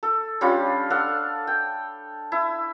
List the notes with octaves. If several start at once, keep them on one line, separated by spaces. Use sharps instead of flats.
A4
G3 C#4 D4 F4
D4 A4 F5 F#5
G5
E4